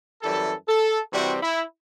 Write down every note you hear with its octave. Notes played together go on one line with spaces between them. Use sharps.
F#2 E3 G3 A4
A4
C3 E3 G3 C4 F#4
E4